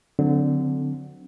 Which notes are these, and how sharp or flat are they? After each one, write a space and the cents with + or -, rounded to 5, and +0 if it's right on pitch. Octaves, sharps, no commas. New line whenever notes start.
D3 +0 F#3 -25 C4 -25